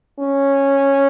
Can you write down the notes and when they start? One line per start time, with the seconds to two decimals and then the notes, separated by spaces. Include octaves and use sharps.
0.20 C#4